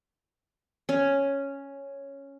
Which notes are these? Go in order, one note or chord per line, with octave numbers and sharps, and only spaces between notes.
C#4